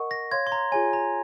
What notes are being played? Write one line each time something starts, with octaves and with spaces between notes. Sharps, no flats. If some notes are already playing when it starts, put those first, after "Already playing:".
Already playing: A#4 D#5 F#5 C#6
A#6
C#5 F5 C6 G#6
C6
A#5
F4 G#4 C#5 G#5
A#5